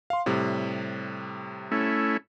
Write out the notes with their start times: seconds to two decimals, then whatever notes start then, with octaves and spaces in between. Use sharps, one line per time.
0.10 F5 C6
0.26 A2 C3 G3
1.72 A3 C#4 E4